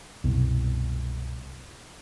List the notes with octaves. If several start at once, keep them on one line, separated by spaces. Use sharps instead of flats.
C2 F#2 B2